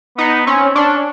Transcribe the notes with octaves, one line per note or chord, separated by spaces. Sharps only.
B3 D#4
C4 C#4
C#4 D4